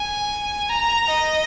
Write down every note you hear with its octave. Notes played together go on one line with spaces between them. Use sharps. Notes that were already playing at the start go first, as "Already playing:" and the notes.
Already playing: G#5
A#5
D#5